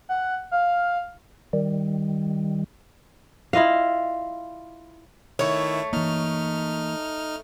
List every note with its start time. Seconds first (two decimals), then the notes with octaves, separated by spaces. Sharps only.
0.09 F#5
0.51 F5
1.53 D#3 G3
3.53 E4 F4 D#5 F5
5.39 D#3 A3 E4 C#5
5.93 E3 A#3 D#4 F6